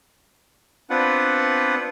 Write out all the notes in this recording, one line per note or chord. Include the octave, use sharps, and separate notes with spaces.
B3 C4 D4 F4 B4 F#5